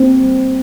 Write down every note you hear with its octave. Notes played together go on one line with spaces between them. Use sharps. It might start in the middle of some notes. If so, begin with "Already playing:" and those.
Already playing: A#3 C4
G3